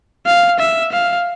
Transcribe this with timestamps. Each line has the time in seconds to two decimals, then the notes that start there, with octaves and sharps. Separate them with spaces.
0.26 F5
0.59 E5
0.92 F5